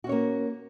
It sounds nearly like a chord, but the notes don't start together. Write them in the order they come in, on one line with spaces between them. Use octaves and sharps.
F#4 C#4 C#5 A#3